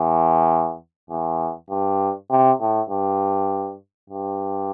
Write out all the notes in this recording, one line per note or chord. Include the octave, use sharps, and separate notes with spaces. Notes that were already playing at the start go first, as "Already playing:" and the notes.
Already playing: E2
E2
G2
C3
A2
G2
G2